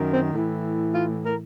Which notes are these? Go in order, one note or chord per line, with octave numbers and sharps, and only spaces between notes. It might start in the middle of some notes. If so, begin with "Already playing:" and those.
Already playing: F#2 D#3
C4
A2 E3
F4
A#4